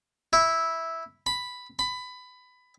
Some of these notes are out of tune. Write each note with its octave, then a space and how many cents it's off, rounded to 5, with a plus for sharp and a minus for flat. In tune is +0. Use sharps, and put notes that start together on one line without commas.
E4 -10
B5 +5
B5 +20